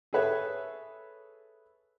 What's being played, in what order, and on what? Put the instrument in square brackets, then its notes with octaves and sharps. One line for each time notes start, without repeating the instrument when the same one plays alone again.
[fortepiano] G#4 A4 B4 C#5 E5